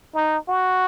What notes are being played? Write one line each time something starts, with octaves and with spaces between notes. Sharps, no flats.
D#4
F#4